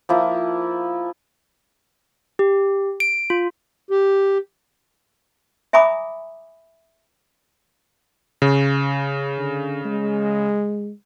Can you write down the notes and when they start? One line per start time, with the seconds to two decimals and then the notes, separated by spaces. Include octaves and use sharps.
0.09 F3 A#3 E4
2.39 G4
3.00 D7
3.30 F4
3.91 G4
5.73 E5 G#5 A#5 B5 D6 D#6
8.42 C#3
9.37 D3
9.85 G#3